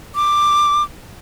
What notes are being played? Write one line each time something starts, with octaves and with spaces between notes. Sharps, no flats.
D6